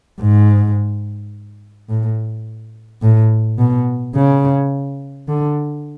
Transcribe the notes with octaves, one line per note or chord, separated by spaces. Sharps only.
G#2
A2
A2
B2
C#3
D3